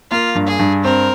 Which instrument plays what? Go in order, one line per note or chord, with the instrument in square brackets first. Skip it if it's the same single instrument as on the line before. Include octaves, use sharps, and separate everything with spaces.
[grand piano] A#3 [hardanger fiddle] F4
[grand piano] G2
[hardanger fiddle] G#4
[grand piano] G2
[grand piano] C4 [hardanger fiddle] A#4